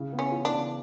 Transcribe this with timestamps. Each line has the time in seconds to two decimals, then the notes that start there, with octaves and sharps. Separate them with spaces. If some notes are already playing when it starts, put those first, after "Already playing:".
Already playing: C#3 E4
0.13 B3
0.19 C#4
0.32 E3
0.45 D4
0.52 C#3